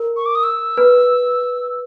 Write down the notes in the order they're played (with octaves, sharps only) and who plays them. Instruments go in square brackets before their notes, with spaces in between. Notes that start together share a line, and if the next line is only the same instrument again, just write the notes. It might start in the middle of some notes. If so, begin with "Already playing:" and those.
Already playing: [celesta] A#4
[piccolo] C#6
D6
D#6
E6
[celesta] B4